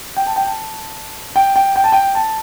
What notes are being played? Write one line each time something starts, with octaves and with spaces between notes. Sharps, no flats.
G5
A5
G5
A5
G5
G5
G5
A5
G5
A5